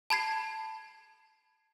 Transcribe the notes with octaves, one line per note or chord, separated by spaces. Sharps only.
A5 B5 G#6 C7